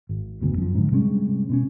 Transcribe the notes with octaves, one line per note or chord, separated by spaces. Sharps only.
G#1
F#1 D2 B2
F#2 F3
G#2 D3
C3 G3 G#3 C#4
B2 C4 C#4